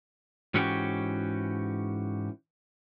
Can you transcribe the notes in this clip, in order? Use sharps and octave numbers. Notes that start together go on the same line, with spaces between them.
G#2 E3 C#4 F#4 G4